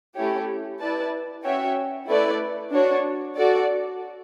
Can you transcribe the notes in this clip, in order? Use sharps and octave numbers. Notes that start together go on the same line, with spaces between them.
A3 C#4 E4 G4 C#5
E4 B4 D5 A5
C#4 F#4 C#5 E5 G5
A3 E4 B4 D5
D4 F#4 C#5
F#4 A4 D5